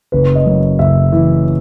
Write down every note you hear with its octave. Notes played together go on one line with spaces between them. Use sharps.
F#1 B4
D#5
F#2
F#1 E5
E3